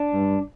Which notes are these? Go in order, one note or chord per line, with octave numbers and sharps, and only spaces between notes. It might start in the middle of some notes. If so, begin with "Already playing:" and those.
Already playing: D4
G2